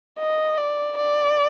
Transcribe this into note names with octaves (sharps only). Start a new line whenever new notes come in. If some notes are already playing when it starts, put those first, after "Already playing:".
D#5
D5
D5